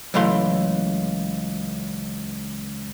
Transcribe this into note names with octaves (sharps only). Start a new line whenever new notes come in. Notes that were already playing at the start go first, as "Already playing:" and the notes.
C#2 E3 F#3 A3 F5 C6